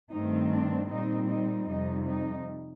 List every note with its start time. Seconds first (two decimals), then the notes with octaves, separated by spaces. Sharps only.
0.11 G2 D#3 A3 C4 D#4
0.51 D4
0.90 A#2 G3 C4 D#4
1.28 D#4
1.67 F2 C3 G3 D#4
2.06 D#4